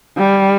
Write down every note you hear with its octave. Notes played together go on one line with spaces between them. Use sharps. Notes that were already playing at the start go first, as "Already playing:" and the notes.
G3